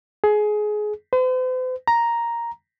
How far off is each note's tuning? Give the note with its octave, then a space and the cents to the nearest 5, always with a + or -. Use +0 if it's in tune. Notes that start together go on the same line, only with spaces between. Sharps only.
G#4 +20
C5 -45
A#5 +5